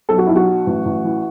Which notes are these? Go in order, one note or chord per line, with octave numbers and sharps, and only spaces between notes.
B1 A4
F#4
B1 E4
F#4
F#3
A1
A1
E3